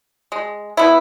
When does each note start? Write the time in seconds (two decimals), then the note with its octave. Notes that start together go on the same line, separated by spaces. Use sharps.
0.32 G#3
0.77 B3 E4